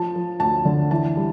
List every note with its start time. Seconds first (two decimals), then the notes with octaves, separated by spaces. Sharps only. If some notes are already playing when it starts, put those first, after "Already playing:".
Already playing: F3 A5
0.15 F3
0.40 D2 A5
0.65 D3
0.91 E3 A5
1.17 G3